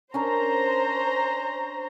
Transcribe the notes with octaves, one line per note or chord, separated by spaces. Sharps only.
C#4 D4 A#4 C5 A#5